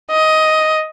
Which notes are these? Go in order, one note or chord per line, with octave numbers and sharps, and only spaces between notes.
D#5